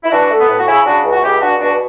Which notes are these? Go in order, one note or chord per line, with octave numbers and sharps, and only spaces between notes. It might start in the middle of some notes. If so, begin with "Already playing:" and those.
E4
E3 D4 F#4
A3
B3
A2
F#4
C#3 C#4 E4
C#3 D4 F#4
C#2
F#4
C#2 E4 G4
C#2 D4 F#4
B2 D4 F#4